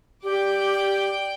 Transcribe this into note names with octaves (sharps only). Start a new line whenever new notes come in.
G4 D5 G5